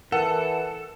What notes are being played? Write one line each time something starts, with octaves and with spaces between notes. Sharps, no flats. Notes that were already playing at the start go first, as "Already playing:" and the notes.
E3 A4 A#4 F#5